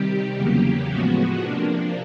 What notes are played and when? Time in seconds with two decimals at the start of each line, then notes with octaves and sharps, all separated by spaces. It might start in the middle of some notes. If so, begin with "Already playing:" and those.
Already playing: C3 D#3 G3 G4
0.36 E2 C#3 F#3 A#3
0.88 A2 F3 G#3 B3 F#4
1.40 C3 F3 A#3 D4